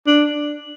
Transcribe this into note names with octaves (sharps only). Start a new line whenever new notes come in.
D4